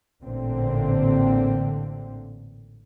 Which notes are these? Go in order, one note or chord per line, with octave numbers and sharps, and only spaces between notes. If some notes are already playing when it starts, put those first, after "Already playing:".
A1 A#2 D3 C4